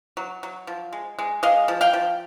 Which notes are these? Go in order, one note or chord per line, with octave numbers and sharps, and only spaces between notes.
F#3
F#3
F3
G#3
G#3
G#3 D#5 F5
F3
F5 G5
F3